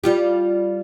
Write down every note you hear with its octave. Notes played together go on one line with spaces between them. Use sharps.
G3 F4 G4